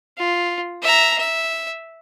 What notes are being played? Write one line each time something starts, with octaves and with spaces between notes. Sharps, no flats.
F4
E5 A#5
E5